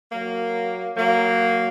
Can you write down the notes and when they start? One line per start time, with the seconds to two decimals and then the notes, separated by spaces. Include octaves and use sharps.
0.12 F#3 A#3
0.97 F#3 A#3